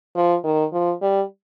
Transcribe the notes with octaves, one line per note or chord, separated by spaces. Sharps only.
F3
D#3
F3
G3